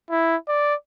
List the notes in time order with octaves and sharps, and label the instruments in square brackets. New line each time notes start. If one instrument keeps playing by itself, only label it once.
[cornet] E4
D5